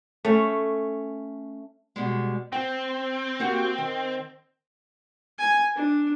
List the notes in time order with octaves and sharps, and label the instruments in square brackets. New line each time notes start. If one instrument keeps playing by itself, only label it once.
[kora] A3 C#4
[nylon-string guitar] B2 G3 G#3
[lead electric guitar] C4 [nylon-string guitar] G5
[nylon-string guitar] A#3 F#4 G4
D#3
[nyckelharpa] G#5
D4